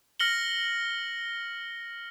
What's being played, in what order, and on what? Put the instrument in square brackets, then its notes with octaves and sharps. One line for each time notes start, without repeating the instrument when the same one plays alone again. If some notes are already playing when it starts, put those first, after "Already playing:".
[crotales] F6 A#6 C#7 F#7 G7